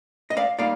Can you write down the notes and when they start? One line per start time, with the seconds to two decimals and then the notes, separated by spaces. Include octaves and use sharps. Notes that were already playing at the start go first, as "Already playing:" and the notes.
0.30 D#5
0.37 D5 F5
0.59 G3 A#3 D#4 D5 F5